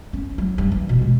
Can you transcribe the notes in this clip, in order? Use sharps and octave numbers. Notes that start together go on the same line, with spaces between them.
C#4
F#3
G2
E3
B2
G#3